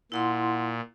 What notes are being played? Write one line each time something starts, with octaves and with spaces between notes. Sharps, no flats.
A#2 E4 F#5 C6